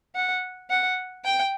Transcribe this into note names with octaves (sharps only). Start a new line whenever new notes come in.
F#5
F#5
G5